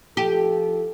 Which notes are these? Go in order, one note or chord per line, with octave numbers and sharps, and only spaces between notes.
F3 F4 G4 A4